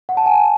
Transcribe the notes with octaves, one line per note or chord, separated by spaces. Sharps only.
F#5
A5
G#5
A5